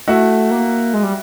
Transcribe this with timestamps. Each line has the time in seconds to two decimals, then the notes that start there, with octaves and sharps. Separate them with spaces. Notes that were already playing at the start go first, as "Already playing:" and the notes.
0.08 A3 E4 F#4
0.51 A#3
0.94 G#3
1.03 G3